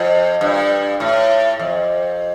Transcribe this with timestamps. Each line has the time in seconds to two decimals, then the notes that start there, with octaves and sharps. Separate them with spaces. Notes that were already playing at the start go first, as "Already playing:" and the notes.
Already playing: F2
0.41 G2
1.00 A2
1.59 F2